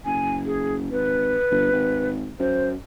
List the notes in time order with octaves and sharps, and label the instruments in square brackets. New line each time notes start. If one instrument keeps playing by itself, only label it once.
[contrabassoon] F#1 [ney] G#5
[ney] G#4
[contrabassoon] G#1 [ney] B4
[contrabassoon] G1
G#1
[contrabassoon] F#2 [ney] C5